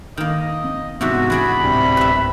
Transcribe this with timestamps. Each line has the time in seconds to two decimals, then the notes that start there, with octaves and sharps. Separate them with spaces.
0.17 D#3 A#3 D#5
0.64 C4
1.01 E2 G#2 C3 B3 F#4 E5
1.30 E2 D4 G#4 D5 B5
1.62 D1 C3 G3 D4
1.97 B4 E5